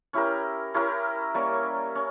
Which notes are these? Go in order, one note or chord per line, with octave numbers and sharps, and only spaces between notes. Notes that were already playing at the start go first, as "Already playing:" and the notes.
C#4 E4 G4 A#4
C#4 E4 G4 A#4
G3 A#3 C#4
C#4